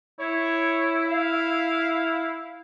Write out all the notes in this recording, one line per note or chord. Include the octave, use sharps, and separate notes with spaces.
E4 C#5
F5